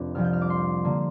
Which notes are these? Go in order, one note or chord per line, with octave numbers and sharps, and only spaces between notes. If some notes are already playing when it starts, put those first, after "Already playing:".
Already playing: F1 F2 D4
C2 C3 F3 F6
G6
F6
D6
C6
D3 A#3